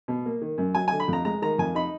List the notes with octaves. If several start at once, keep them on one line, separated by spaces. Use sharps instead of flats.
B2
A#3
D#3
F#2
F#3 G#5
D3 G#5
B5
F2 A#5
G#3 A#5
D#3 A#5
F2 G#5
D#4 B5